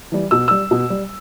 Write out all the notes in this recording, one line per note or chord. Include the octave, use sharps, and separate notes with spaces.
E3 G3
B2 E6
G3 E6
B2
G3